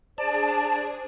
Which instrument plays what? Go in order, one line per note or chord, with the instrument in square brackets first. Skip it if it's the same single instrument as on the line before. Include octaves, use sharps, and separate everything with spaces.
[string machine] D4 G#4 [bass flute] C5 [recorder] D5 [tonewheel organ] A5